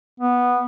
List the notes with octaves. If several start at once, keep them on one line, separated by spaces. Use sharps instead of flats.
B3